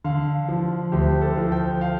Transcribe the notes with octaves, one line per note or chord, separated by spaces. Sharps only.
D3 F5
F3
D2 G4
A4
F3
G5
F5